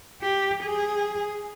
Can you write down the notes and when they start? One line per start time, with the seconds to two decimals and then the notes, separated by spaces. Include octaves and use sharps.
0.22 G4
0.63 G#4